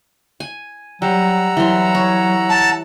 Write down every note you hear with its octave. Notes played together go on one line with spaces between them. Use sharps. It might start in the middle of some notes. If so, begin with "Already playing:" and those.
G#5
F#3 G3 F#5 A#5 E6
E3 F#3 C6
C#5
A5